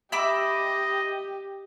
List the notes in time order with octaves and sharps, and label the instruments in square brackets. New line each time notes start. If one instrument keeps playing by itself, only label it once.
[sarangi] G4 [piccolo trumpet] D#5 [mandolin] E5 B5 D6